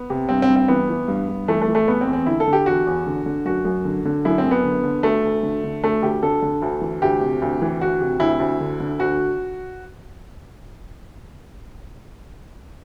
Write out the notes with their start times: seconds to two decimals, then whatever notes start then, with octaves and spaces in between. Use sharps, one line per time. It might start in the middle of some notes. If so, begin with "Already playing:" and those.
Already playing: B3
0.10 C3
0.29 G2 C4
0.42 C4
0.49 G2
0.56 C4
0.68 E3 B3
0.89 E3
1.08 G2
1.29 G2
1.48 E3 A3
1.62 A3
1.68 E3
1.75 A3
1.87 E2 B3
2.01 C4
2.07 E2
2.13 C4
2.26 D3 E4
2.40 A4
2.47 D3
2.53 G4
2.66 E2 F#4
2.87 E2
3.06 D3
3.26 D3
3.45 F#2 F#4
3.65 F#2
3.85 D3
4.05 D3
4.25 F#2 E4
4.38 C4
4.45 F#2
4.51 B3
4.64 D3
4.83 D3
5.03 D2 A3
5.24 D2
5.43 D3
5.64 D3
5.84 D2 A3
6.02 D2 G4
6.23 D3 A4
6.42 D3
6.62 D2
6.81 E3
7.02 D2 G4
7.21 C3
7.42 D2
7.61 E3
7.81 D2 F#4
8.01 C3
8.20 D2 E4
8.40 D2
8.60 D3
8.80 D3
8.99 D2 F#4